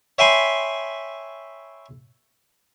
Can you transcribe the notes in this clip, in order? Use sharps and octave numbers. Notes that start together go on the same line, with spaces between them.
C#5 E5 G5 G#5 B5 C6